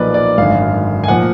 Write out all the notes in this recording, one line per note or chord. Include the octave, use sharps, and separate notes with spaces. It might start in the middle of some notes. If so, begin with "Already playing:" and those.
Already playing: B1 A#2 F3 B4 D5
D5
G#1 F#2 D3 F5
G#5
A#2 F3 F#5